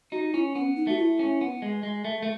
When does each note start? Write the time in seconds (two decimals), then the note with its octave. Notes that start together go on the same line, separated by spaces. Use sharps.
0.12 D#4 F#4
0.34 C#4 E4
0.55 B3 C#4
0.76 D#4
0.87 A3 F#4
0.98 E4
1.19 C#4
1.41 B3
1.62 G#3
1.83 G#3
2.05 A3
2.22 A3